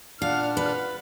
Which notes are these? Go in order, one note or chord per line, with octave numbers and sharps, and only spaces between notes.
A#2 D4 F5 F#5 F6
B4